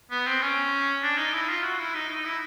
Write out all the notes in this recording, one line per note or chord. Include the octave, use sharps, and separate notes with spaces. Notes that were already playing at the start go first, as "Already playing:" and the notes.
B3
C4
C#4
D4
D#4
E4
F4
F#4
E4
D#4
D#4
E4